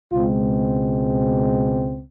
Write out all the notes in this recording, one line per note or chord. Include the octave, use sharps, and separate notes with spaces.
C#2 B2 G#3 C4 F4